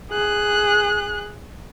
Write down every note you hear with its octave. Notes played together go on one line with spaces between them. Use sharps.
G#4 F#6